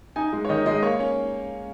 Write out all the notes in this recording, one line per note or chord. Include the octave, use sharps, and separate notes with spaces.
D#4 G#5
G#3
C#5
D#3 D#5
G#3 D#5
A#3 C#5
C#4